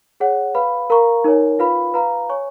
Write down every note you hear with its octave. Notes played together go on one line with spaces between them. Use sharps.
G#4 C#5 F#5
B4 F5 B5
A#4 F5 A#5 C#6
D#4 A#4 C#5 G#5
F4 B4 F5 B5
B4 F5 A#5
C#5 G#5 C#6